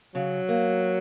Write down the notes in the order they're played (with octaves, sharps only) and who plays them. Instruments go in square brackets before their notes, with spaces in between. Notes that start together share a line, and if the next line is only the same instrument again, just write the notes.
[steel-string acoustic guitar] C#3 [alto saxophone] F#3
[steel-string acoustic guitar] A#3